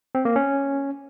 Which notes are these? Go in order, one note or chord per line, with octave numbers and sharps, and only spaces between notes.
C4
A#3
C#4